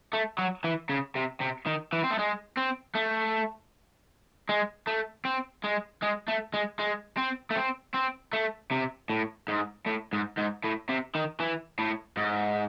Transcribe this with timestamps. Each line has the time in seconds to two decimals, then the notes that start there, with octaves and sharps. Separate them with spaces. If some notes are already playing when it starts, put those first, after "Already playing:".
0.13 A3
0.38 F#3
0.64 E3
0.89 C#3
1.16 C3
1.41 C3
1.67 D#3
1.93 E3
2.03 C4
2.11 A3
2.19 G#3
2.57 C4
2.95 A3
4.49 G#3
4.87 A3
5.25 C4
5.64 G#3
6.02 G#3
6.28 A3
6.54 G#3
6.79 G#3
7.18 C4
7.51 A3
7.56 C4
7.94 C4
8.33 A3
8.71 C3
9.10 A2
9.48 G#2
9.87 A2
10.13 G#2
10.37 G#2
10.64 A2
10.89 C3
11.15 D#3
11.40 E3
11.79 A2
12.17 G#2